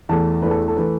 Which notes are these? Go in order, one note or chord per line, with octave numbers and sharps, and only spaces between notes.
E2 E3 A3 A5
E2 E3 A3 B4
A4
A4
E3 A3 B4